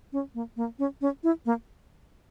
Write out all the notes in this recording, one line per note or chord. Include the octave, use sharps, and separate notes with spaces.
C#4
A#3
A#3
C#4
C#4
E4
A#3